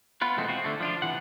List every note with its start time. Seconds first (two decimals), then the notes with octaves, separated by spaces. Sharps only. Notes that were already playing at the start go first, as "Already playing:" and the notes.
0.21 B3 F4 B4
0.37 B2 E3 G#3 A3 C4 F#4
0.48 C4 F4 F#4
0.64 D3 A3
0.80 F3 D4 F4
1.02 C3 E3 F#5